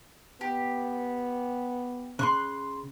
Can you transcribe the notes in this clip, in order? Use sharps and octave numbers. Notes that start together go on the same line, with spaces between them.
B3 G4
C#3 C6 C#6 F#6